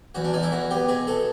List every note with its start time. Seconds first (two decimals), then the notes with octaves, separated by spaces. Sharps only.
0.15 E2 F#4
0.24 D4
0.33 E2 D#4
0.43 E4
0.52 E2 F#4
0.71 B3 G4
0.88 B2 G#4
1.07 B2 A4